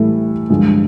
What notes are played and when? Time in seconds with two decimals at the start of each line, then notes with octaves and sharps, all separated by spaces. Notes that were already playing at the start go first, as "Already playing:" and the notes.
Already playing: A2 E3 G3 A3
0.50 G2 D3 F3 G#3